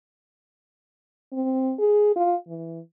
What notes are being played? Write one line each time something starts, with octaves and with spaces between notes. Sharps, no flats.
C4
G#4
F4
E3